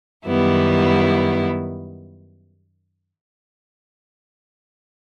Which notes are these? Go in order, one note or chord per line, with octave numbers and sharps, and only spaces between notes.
F#2 D#3 G3 B3 E4